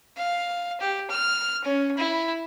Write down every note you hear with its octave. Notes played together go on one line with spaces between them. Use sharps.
F5
G4
F6
C#4
E4